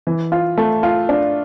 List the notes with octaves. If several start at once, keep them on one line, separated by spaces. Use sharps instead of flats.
E3
F4
A3
F4
D4